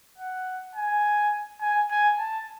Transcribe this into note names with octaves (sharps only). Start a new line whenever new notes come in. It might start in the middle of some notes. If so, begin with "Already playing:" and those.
F#5
G#5
G#5
G#5
A5